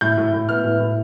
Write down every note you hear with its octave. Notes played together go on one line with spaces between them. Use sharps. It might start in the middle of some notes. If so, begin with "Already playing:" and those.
A2 G6
A2
A2
B3 F6
A2
A2